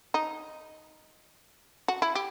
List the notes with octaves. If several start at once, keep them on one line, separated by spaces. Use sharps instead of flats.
D#4
F#4
E4
G4